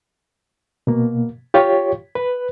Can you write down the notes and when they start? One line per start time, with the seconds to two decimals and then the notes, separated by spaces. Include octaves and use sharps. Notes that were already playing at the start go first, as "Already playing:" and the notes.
0.87 B2 A#3
1.54 F4 G4 C#5
2.15 B4